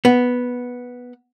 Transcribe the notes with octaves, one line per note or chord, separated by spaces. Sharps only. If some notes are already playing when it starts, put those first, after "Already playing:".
B3